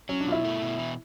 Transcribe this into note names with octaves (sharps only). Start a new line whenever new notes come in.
F#3 C#4
D4
B2 F4
E4
A3
B2
E3